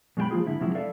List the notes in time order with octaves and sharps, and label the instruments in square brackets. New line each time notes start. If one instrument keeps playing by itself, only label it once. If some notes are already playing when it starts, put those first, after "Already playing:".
[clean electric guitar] F#2 B2 G#3 E4 G5 B5
F3 A#3 F4 G#4
G#2 D3 E4
F2 C3 F3 F#3 G#3 E4
A4 B4 D5 E5 F5